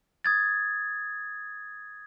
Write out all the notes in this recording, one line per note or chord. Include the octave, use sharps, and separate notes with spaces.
D#6 G#6 A6